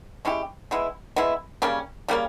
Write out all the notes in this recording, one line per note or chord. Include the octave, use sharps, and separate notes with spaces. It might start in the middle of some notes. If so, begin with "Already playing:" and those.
G#3 C#4 E4 G4
G#3 B3 E4
G#3 B3 E4
C#3 G3 A#3 C#4
C#3 G3 A#3 C#4